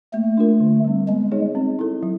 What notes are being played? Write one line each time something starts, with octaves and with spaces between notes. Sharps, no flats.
A3 A#3
D4 F4 A#4
D3
G3 C4
G#3 B3
D#4 G#4 C#5
C4
E4 A4
F#3